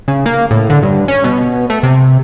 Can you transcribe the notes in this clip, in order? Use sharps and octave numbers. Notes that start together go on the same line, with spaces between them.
C#3
A#3
A2
D3
G2
C#4
B2
A3
C3